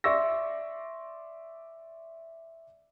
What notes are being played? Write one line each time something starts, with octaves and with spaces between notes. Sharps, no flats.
D5 E5 C6 C#6 E6 A#6